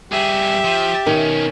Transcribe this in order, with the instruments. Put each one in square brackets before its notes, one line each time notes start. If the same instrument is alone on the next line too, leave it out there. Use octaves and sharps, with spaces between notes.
[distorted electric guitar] G2 G#4 [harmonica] G4 [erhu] E5
[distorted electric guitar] F3
[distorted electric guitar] B1 C#4 [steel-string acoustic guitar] D#3